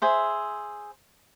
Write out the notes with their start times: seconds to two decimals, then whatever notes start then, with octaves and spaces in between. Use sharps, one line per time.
0.02 G#4 C5 E5